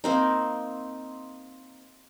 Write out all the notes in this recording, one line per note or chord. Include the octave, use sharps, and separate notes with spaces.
A#3 C4 D#4